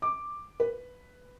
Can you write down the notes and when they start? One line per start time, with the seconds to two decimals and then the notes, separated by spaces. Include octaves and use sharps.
0.02 D6
0.60 B4